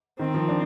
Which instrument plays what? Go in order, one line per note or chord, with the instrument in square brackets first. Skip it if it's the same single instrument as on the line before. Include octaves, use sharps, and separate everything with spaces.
[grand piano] D#3 [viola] C4
[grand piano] F3
D4